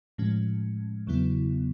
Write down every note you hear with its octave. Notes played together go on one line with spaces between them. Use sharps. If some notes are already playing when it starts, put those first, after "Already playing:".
A2 F3 G#3 C#4
E2 C#3 F#3 B3 E4